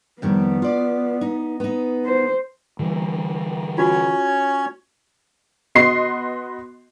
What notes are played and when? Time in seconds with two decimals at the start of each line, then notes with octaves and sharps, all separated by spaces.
0.22 F2 D#3 G3 B3
0.62 F4 D5
1.21 D#4
1.60 B3 D#4
2.06 C5
2.79 D3 E3 G3
3.78 C#4 F4 F#4 C#5
5.75 B3 F#4 D#5 C6 C7